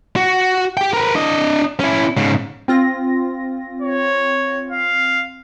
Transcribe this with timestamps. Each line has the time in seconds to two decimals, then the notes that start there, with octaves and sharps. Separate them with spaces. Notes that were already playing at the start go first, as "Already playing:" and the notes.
0.16 F#4
0.77 G4 G5
0.93 A#4 B4
1.15 D4 D#5
1.80 C#4 E4
2.17 G#2 C#3
2.68 C4 F4 A#6
3.81 C#5
4.71 F5